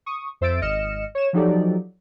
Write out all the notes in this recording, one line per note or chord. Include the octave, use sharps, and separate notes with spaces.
C#6 D#6
F2 C5 E5 E6 A6 D7
G#1 D#5 F6 C#7 E7
C#5 E7
F3 F#3 D#4 G4 A4 D5